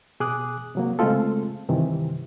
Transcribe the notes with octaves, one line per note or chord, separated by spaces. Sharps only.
B2 G#4 D6 D#6 F#6
C3 F#3 A#3
C#3 G#3 A3 C4 F4 A4
G2 C3 D#3 E3